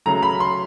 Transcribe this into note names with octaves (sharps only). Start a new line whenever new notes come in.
C#3 F#3 A3 A#5
B5
C6